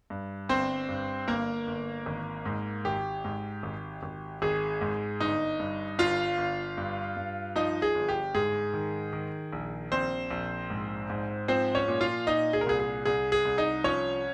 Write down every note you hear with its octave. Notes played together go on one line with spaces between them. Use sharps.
G2
G1 C4 C5
G2
G1 A#3 A#4
G1
G#1
G#2
G#1 G4
G#2
G#1
G#1
G#1 G#4
G#2
G1 D#4 D#5
G2
G1 F4 F5
G1
G2
G2
F3 D#4 D#5
G#4
G1
G4
G#2 G#4
D#3
D#3
A#1
A#1 C4 C5
A#1
G#2
G#2
F3 C4 C5
C#4 C#5
A#2
F4 F5
A#2 D#4 D#5
G#4
A#4
C2 G#4
G#4
C2 G#4
G#4
C2
D#4 D#5
F3 C#4 C#5